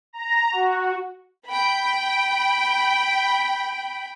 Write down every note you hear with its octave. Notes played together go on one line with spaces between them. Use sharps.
A#5
F#4
G5 B5